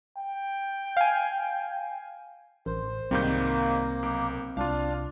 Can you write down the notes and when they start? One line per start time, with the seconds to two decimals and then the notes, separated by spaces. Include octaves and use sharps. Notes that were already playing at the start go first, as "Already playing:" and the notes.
0.18 G5
0.97 F5 G#5
2.66 A1 A#4 C5
3.11 C2 G#2 D#3 G3 A#3 C4 G6
4.03 B1 D6
4.57 C2 D4 F4 F5